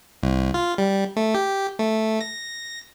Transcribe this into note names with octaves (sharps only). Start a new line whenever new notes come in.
C2
F4
G3
A3
G4
A3
A#6